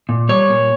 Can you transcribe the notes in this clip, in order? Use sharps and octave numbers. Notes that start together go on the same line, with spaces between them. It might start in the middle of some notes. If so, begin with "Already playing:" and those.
A#2
G3 C#5
A#2